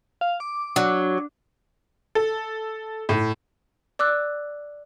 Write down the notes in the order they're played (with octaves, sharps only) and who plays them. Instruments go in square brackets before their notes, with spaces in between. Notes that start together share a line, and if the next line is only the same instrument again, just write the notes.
[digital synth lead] F5
D6
[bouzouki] F#3 [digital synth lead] D4
[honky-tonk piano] A4
A2
[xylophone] D5 D6 E6 F#6